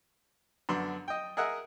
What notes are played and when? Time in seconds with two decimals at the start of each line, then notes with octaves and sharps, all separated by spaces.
0.69 F#2 D3 B3 D4 C6
1.08 D#5 G5
1.37 G#4 A#4 D#5 E5 F#5